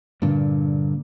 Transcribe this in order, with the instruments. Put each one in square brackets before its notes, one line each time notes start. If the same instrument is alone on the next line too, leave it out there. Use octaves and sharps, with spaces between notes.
[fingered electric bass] G2 A#2 D3